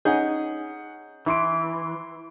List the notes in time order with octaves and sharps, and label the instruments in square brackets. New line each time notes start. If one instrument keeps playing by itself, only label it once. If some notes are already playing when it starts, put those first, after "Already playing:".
[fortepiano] C#4 D#4 G#4 [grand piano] F#5 G6
[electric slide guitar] E3 [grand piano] E4 C6 D7